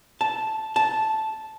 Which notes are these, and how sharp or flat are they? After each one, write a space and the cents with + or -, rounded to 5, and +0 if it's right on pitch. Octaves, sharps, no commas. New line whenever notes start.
A5 -5
A5 -5